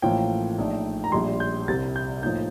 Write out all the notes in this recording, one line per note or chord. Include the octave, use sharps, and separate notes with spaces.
A1 A2 F3 A#3 F4 G5
A#1 A#2 A3 D#4
A#5
A#1 A#2 G3 C6
G6
C2 C3 G3 A6
G6
A2 F3 A#3 D#4 G6